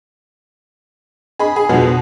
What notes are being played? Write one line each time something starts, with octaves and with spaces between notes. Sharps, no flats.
G#4 D#5 B5
G#4
F2 B2 F#3 G#3 B3
B2